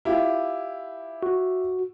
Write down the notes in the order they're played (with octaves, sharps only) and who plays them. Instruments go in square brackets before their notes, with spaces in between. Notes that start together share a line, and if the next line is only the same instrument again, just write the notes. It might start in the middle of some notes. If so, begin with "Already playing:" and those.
[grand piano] E4 F4 G4
[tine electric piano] F#4